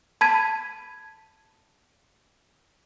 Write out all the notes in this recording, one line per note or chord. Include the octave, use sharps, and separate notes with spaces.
A5 B5 G#6 B6 D#7